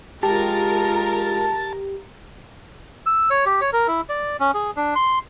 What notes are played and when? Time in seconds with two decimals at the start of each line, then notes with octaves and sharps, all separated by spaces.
0.23 G#3 F4 G4 A#4 A5
3.06 E6
3.30 C#5
3.46 G4
3.61 C#5
3.73 A#4
3.88 E4
4.09 D5
4.40 C#4
4.54 G#4
4.77 D4
4.96 C6